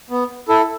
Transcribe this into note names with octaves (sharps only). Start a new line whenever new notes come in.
B3
E4 A4